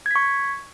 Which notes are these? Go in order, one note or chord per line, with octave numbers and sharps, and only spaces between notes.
C#6 G#6 B6